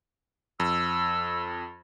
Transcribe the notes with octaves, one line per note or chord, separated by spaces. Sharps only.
F2 E6